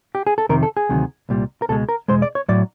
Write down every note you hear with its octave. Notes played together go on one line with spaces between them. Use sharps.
G4
G#4
A4
F2 C3 D#3 A#4
A4
G#4
D2 C3 D#3 F#3
C2 A#2 G3
A#4
C#2 B2 G#3 A4
A#4
E2 B2 G#3 C5
D5
C#5
A2 F#3 D5